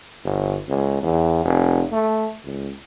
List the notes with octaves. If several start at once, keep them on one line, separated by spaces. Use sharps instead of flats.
G1
C#2
E2
F1
A3
C#2